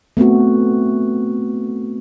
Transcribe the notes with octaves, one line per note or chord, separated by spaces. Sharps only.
A3 B3 C4 F#4